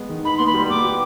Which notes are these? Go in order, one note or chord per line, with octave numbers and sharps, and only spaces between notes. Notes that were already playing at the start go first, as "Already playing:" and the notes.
Already playing: G#3 B3
D#3
D#4 B5
B3 C6
B5
G3
B3 D6
G4